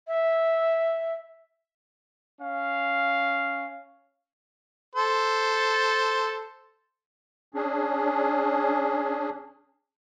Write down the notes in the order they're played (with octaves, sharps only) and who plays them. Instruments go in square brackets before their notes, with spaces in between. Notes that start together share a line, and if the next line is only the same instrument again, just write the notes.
[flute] E5
[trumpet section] C#4 F5
[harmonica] A4 C5
[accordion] C#4 D4 G#4